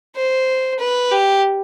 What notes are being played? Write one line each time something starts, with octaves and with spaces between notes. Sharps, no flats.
C5
B4
G4